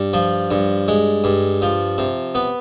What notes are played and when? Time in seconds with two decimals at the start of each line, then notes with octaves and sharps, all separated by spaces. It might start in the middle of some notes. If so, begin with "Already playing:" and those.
Already playing: G2
0.13 F3
0.51 G2
0.88 G#3
1.24 G2
1.62 F3
1.98 C3
2.35 B3